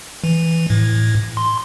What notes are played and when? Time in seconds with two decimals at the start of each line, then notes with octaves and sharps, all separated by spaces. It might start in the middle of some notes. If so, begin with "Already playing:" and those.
0.24 E3
0.70 A2
1.37 C6